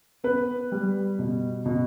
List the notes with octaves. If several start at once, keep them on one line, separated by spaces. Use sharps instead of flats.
B3 B4
G3
B2
B2